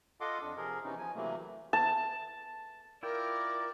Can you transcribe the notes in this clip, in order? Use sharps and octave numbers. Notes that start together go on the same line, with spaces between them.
F4 A4 D#5 F#5 C6 D6
F2 D4
C3 F3 G#4 A#4
C3 E3 B3 C#4 D#4
F3 G#5
C3 E3 F#3 A3 A#3
A5
E4 F4 A#4 D5 G5